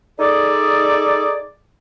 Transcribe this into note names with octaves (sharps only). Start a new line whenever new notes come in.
D#4 G#4 A4 D5